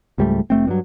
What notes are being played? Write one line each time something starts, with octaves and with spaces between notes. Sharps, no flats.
C#2 G#2 G3 A3
F1 A3 C4
G2 F#3